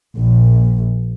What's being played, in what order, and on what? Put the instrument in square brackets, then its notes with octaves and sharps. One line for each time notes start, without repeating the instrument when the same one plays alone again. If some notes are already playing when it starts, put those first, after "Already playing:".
[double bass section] A#1